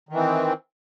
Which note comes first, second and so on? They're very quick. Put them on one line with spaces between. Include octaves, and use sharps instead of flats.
D#3 E3 C4